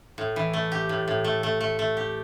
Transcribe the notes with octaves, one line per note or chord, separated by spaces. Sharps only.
A2
E3
A3
G4
A2
A2
A3
A3
A3
A3
G4